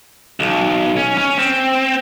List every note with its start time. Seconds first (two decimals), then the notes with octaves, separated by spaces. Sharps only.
0.40 B1
0.97 C#4
1.18 C#4
1.39 C4